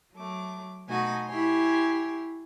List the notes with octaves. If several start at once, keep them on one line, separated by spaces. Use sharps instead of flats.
F#3 A3 D6
B2 A3 D#4 F#4 G#5
E4 G4 C#5 G#5 C6